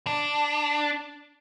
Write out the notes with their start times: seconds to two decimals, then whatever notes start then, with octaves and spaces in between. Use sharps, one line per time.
0.07 D4